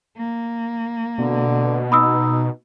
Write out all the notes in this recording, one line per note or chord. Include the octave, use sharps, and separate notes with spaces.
A#3
B2 D3
D#4 B5 D#6 E6